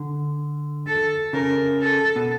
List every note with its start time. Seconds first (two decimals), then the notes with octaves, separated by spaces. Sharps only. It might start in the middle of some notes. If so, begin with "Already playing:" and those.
Already playing: D3
0.87 A4
1.33 C#3 A#4
1.80 A4
2.16 B2